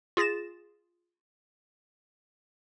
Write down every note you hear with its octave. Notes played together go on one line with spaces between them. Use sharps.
F4 G#4 A6 A#6 E7